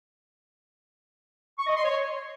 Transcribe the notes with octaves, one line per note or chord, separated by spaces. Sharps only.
C#6
D#5
C6
C#5